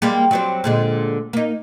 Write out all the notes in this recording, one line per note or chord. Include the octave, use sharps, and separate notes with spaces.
G3 G#3 A#3
F#3 G3 C4
A#2 D3 G#3
A#3 D#4